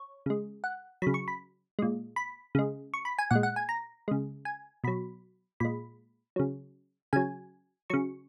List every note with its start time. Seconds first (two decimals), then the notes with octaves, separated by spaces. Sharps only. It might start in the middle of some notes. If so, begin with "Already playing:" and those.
Already playing: C#5
0.26 C#3 G#3
0.64 F#5
1.02 C#3 F#3 B5
1.14 C#6
1.28 B5
1.79 A#2 G#3
2.16 B5
2.55 C#3 G#3
2.94 C#6
3.05 B5
3.19 G#5
3.31 A#2 G#3 F#5
3.43 F#5
3.56 G#5
3.69 A#5
4.08 C#3 G#3
4.45 G#5
4.84 B2 F#3 B5
5.60 A#2 G#3 B5
6.36 C#3 F#3
7.13 C#3 F#3 G#5
7.90 C#3 F#3 C#6